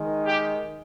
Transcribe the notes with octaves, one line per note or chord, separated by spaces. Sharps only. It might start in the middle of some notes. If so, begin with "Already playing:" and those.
Already playing: D#3 G#3
G4